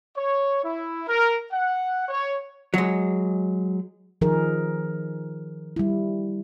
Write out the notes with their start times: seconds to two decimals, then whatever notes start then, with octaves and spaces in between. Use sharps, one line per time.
0.16 C#5
0.64 E4
1.07 A#4
1.50 F#5
2.09 C#5
2.74 F#3 G#3
4.21 D#3 F3 D#4 G#4 A#4
5.76 G3 E4